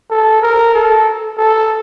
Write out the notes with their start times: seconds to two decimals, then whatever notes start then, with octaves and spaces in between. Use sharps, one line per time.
0.11 A4
0.43 A#4
0.74 A4
1.38 A4